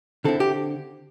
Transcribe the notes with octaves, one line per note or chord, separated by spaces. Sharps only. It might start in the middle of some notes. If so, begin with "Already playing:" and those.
D3 C4 E4 A4
G4